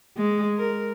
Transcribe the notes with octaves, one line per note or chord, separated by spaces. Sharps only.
G#3
A#4